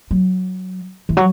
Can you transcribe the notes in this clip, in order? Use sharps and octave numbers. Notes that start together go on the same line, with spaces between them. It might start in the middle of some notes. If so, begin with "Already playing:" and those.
F#3
E3
F#3